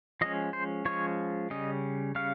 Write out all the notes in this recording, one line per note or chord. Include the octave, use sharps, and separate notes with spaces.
F3 G#3 C#4 D#5
C5
F3 G#3 C#4 C#5
C#3 G3 C#4 D#5
C#3 G3 C#4 F5